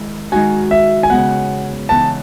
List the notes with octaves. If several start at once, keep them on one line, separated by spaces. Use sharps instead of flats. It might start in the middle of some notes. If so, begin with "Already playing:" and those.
Already playing: D#3 G#3 E4
D#3 G#3 D#4 F#4 G#5
E5
G#5
C#3 G#3 B3 F#5
C#3 E3 B3 D#4 A5